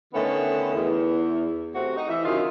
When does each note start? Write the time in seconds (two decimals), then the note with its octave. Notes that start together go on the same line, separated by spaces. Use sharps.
0.14 D3 D#3 A3 B3 C#4
0.74 E2
1.74 C3 A3 C4 F#4
1.96 D#4
2.09 E3 E5
2.24 F#2 C3 D#3 F4 G#4